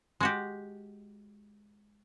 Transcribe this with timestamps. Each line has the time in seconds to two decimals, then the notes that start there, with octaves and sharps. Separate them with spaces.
0.21 G#3 F#4 G4